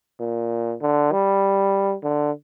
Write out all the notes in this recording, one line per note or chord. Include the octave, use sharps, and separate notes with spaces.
A#2
D3
G3
D3